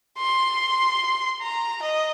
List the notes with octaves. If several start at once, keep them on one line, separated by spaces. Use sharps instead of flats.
C6
A#5
D#5